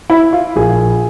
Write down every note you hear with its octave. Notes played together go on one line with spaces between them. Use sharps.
E4
F4
A#1 A#2 F3 G#4